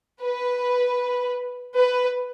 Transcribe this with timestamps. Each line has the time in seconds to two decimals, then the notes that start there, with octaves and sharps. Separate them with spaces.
0.20 B4
1.76 B4